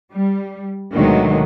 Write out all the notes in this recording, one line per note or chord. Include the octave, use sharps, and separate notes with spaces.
G3
D2 B2 D#3 F#3 G#3